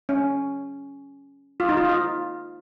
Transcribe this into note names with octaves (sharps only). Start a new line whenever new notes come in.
C#4
F4
D#4
F4
F4